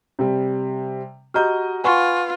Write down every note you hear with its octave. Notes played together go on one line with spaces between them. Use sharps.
C3 G3
F#4 G4 D#5 A#5 F6 G6
F4 B4 F#5 G#5 C6 C#6